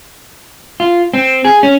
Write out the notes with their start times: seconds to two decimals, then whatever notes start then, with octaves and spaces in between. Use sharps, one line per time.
0.80 F4
1.14 C4
1.45 G#4
1.63 C#4